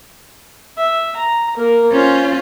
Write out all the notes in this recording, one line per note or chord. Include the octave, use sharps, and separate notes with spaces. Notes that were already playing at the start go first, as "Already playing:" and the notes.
E5
A#5
A#3 A#4
C#4 F4 C5